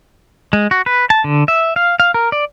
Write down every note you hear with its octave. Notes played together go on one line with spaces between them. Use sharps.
G#3
F#4
B4
A5
D3
E5
F5
F5
A#4
D5